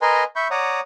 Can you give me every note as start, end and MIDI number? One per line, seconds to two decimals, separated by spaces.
0.02 0.24 70
0.02 0.24 71
0.02 0.24 75
0.02 0.24 80
0.02 0.24 82
0.02 0.24 84
0.36 0.48 76
0.36 0.48 83
0.36 0.48 85
0.36 0.48 91
0.51 0.80 73
0.51 0.80 74
0.51 0.80 78
0.51 0.80 82
0.51 0.80 87